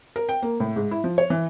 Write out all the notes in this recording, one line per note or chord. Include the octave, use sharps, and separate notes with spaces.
A#4
G5
A#3
A2
G#2
E4
F3
C#5
E3